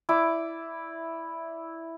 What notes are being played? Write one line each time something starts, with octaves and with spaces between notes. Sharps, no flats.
E4 D5 D6